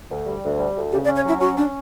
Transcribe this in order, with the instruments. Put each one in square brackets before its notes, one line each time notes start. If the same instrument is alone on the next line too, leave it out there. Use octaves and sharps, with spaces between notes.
[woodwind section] D2
G3
D2
G3
D2
[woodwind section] C#3 [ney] G4
[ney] D5
[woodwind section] C#4
[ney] C#5
[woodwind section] F#3 [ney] E4
[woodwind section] C#4 [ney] F#4
[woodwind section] C#4 [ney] D4